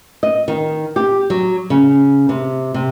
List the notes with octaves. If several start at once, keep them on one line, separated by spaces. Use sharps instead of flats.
D#5
D#3
G4
F#3
C#3
C3
C3